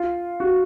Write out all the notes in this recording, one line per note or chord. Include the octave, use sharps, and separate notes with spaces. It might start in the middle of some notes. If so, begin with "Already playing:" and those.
Already playing: F4
F#4